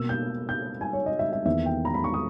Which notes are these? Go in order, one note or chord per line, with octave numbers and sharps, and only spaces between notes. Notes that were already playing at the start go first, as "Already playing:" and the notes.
Already playing: B2 A#3 E6
G6
G6
G#5
C#5
D#5
E5
E5
E2 D#3 A#3 E5
G5
A#5
B5
C#6
D#6